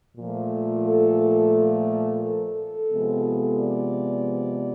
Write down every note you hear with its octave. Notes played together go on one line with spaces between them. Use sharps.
A#2 F3 A3
A4
A4
C3 F3 G#3 B3
D5